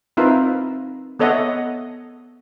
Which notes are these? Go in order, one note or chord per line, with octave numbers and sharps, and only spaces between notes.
C4 D#4 F4 A#4 B4 E5
B3 A4 C#5 D#5 E5 F#5